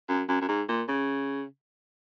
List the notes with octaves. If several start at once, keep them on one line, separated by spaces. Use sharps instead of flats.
F#2
F#2
F#2
G#2
A#2
C#3